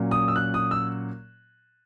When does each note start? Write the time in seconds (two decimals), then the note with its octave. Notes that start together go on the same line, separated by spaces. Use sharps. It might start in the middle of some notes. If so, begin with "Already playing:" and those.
Already playing: A#2 F#3 C#4
0.11 D#6
0.28 E6
0.36 F#6
0.54 D#6
0.71 E6